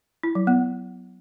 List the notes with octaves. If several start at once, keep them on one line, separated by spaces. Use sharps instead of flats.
E4
F#3
B3